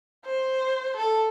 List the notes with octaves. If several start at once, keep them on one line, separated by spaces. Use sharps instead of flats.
C5
A4